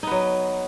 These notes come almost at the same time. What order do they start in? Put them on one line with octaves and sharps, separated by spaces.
D#4 B3 F#3